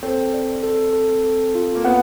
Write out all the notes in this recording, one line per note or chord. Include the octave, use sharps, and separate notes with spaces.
C4 A4
D5
A4
A4
A4
F4
A#3
B3 F#5